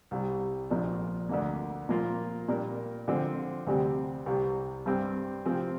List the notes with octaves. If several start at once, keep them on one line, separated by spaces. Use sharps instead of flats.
C2 C3 G3
A#1 A#2 F3 D4
D2 D3 A#3
A#2 F3 A#3 F4
A#2 G3 D4 A#4
D3 F3 C4
D2 C3 G3 C4
C2 C3 G3
G2 G3 C4 G4
C3 F3 C4